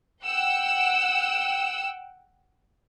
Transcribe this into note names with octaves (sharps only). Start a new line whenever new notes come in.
F#5 G5 E6